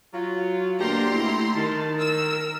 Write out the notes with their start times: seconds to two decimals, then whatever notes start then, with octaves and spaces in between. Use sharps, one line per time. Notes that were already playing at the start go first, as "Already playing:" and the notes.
0.13 F#3 F4
0.79 D2 B2 A#3 D4 G4 A#5 C6
1.15 A3 E4
1.55 D#3 A5
1.99 A#4 E6